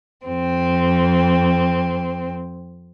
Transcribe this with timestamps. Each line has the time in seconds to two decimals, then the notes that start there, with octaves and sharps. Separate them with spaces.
0.25 F2 C4